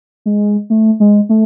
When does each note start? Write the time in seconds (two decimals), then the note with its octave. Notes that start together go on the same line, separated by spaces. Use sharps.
0.26 G#3
0.70 A3
1.00 G#3
1.29 A3